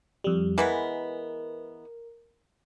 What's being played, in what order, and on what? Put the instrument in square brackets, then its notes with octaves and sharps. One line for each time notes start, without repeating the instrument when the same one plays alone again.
[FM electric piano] F2 G3
[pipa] E3 G#3 B3 [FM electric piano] A#4